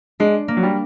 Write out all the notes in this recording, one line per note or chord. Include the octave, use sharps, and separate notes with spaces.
G#3 D4
A#3
F#3
G3